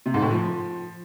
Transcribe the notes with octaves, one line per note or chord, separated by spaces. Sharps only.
C3
G#2
A2
F3